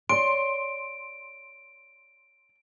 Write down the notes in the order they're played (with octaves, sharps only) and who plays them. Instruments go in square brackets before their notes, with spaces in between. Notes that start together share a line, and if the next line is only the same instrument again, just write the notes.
[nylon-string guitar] C#5 D5 [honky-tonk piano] C6 [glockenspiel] D7